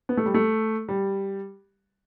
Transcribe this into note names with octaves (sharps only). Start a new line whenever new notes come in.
B3
A3
G3
A3
G3